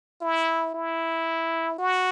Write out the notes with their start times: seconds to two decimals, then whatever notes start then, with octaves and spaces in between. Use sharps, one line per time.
0.21 E4
0.74 E4
1.78 F#4